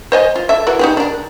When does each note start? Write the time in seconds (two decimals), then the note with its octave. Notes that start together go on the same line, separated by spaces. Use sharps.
0.12 C5 D#5 G#5
0.36 F4
0.49 A4 E5
0.67 E3 F#4 A#4
0.79 D#4 G4 G#4
0.97 D4 A#4